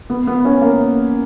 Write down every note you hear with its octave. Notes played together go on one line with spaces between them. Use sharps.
B3
B3
C#4
A#3